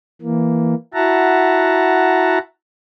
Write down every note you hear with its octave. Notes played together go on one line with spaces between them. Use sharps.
E3 A#3
E4 F#4 E5 F#5 A5 A#5